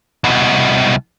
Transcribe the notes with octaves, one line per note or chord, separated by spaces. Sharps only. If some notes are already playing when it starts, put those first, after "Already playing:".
C2 B2